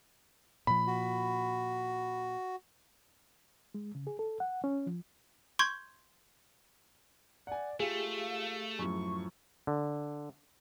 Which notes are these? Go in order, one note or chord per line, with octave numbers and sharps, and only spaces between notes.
A#2 F3 B5
F#4
G#3
C#3
G#4
A4
F#5
C#4
F3
C6 C#6 G6 G#6
D5 F#5 G#5
A3 F4 G4 G#4 F5
F#2 A2 F3 C#6
D3